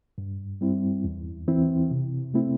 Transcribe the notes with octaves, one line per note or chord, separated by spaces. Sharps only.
G2
G3 C4 E4
E2
E3 C4 E4
C3
A3 C4 E4